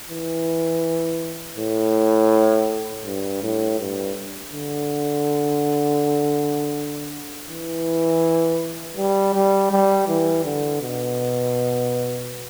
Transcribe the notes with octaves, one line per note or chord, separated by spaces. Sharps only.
E3
A2
G2
A2
G2
D3
E3
G3
G3
G3
E3
D3
B2